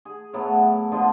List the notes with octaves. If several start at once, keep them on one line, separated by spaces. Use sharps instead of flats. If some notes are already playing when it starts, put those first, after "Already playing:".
G#4
A2 F#3 A3 B3
E4
D3 F3 G#3 B3